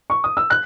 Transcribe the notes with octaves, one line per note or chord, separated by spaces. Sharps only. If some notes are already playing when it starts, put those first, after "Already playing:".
C#6
D#6
E6
F#6